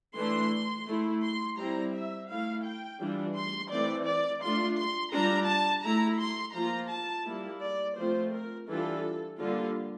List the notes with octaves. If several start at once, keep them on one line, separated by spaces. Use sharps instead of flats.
E3 A3 D4 C6
A3 E4
C6
G3 C4 E4 A#5
E5
A3 E4 F5
G5
E3 G3 D4 F4
C6
E3 A3 C4 D5
D5
A3 D4 F4 C6
C6
G3 D4 F4 A#5
A5
A3 E4 A#5
C6
F3 A#3 F4 A#5
A5
G3 A#3 E4
D5
F3 A3 C4 F4 C5
A#4
E3 G3 D4 F4 A4
D3 G3 A#3 F4